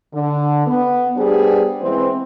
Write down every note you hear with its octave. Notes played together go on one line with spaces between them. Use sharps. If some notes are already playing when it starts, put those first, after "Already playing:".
D3
B3
G3 B3 D4 G#4 C5
E3 G#3 B3 C4